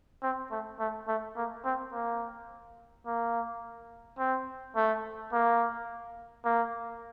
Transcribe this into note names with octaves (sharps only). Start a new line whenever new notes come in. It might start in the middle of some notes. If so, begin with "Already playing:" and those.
C4
A3
A3
A3
A#3
C4
A#3
A#3
C4
A3
A#3
A#3